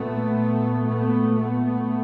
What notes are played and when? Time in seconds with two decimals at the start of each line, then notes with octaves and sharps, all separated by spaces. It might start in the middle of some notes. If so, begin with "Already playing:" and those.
Already playing: A#2 A3 B3
0.86 A#2 A3 B3
1.34 A3 B3